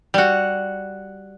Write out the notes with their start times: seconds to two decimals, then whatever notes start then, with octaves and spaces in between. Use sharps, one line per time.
0.14 G3 F#4